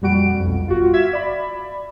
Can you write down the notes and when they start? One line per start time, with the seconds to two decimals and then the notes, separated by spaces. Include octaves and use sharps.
0.01 F2 A#2 G3 F#4 F#5 D7
0.39 B1 F2
0.66 G1 F4 F#4
0.93 E5 F5 G#6 B6 E7
1.13 D5 B5